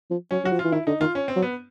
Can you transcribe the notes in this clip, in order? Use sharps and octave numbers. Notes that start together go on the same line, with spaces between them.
F3
F#3 C#4
F#3 F#4
F3
F4
E3
D#3 E4
D3 D#4
D#3 F4
C#4
C4
F#3
B3